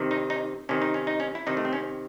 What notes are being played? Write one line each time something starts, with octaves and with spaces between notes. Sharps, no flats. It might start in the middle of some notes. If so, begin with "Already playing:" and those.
Already playing: C3 D#3
D#4
D#4
C3 D#3 C#4
D#4
C#4
D#4
C#4
E4
C3 D#3 D#4
A3
C4
C#4